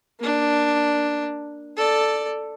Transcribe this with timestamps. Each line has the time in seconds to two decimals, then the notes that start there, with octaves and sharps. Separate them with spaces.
0.20 A#3 D4
1.76 A4 D5